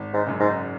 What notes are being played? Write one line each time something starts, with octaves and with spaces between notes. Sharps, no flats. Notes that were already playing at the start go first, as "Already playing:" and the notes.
Already playing: G#1
G#2
F#2 C#3
G#2